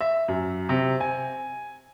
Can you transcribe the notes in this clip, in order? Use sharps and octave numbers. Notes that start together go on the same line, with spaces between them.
E5
F#2
C3
G#5